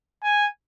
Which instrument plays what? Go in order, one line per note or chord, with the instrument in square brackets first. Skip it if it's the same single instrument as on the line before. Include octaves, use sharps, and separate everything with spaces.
[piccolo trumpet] G#5